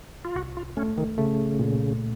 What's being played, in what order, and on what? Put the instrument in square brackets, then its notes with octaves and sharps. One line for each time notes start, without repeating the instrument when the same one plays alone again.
[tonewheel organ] F4
[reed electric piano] C2 [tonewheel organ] F#4
[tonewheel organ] F4
[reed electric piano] A3 [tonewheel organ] C#4
[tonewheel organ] D#3
[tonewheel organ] C#3 [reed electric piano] A3
[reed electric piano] A#2